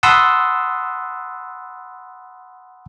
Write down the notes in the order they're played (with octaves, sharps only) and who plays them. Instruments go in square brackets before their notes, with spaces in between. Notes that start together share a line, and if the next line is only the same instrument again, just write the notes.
[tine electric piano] F#5 A5 B5 C6 D#6 E6